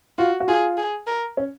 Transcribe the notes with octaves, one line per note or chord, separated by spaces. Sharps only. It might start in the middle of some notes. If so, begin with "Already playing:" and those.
F4 F#4
F#4
F4 G#4
G#4
A#4
C#4